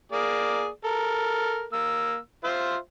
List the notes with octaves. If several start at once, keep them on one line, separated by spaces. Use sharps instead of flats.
A#3 G#4 D5
A4 A#4
A#3 E6
F4 C5 E5